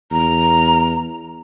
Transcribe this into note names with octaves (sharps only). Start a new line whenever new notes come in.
E2 A#5